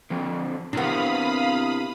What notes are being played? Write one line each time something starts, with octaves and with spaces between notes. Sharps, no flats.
D3 F3 C4
C3 B3 D4 E4 A#4 F5 B5 D#6